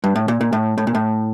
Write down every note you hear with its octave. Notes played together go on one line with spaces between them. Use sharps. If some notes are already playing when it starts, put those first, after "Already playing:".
G2
A2
A#2
A#2
A2
A2
A#2
A2